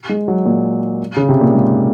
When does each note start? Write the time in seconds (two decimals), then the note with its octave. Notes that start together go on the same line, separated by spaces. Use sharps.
0.09 G#3
0.28 F#3
0.46 A#2
1.17 C#3
1.29 C3
1.41 A#2
1.54 G#2